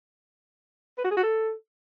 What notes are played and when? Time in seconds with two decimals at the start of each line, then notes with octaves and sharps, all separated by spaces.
0.98 B4
1.04 F#4
1.11 G#4
1.17 F#4
1.23 A4